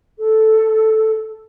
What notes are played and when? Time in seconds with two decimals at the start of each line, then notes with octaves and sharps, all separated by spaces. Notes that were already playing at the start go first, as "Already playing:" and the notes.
0.19 A4